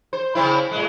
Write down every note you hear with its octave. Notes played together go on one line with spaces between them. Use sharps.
C5
C#3 C4 E4
A2 G#3